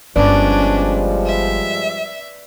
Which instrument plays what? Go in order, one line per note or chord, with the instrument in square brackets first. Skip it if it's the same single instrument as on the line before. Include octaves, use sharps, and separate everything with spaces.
[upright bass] G1 [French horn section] F3 G3 G#3 [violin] C#4 D4 [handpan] B4 D5
[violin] E5